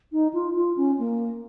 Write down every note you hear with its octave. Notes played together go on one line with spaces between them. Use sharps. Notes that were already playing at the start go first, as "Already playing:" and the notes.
D#4
F4
F4
C#4
A#3